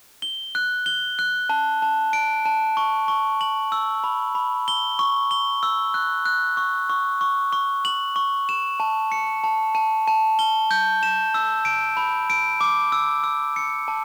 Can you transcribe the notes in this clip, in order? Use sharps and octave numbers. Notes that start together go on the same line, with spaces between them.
G7
F#6
G7
F#6
A5
A5
D7
A5
C#6
C#6
F#7
E6
B5
B5
G7
C#6
G7
E6
F#6
F#6
C#6
C#6
C#6
C#6
F#7
C#6
E7
A5
C#7
A5
A5
A5
G7
G6
E7
E6
D7
B5
D7
D6
E6
E6
C#7
A5